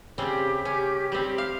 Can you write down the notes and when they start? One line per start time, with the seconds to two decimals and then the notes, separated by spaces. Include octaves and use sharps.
0.18 C#3 G3 C4 G4
0.65 C#4
1.12 G3 C4
1.38 F5